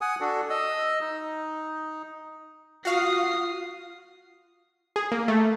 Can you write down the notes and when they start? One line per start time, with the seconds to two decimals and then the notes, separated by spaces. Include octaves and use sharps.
0.01 F#5 G#5 D#6
0.20 D4 F#4 A4
0.50 D#5 E6
1.01 D#4
2.85 F4 F#4 F5 D#6 C7
4.96 G#4
5.12 A#3
5.28 A3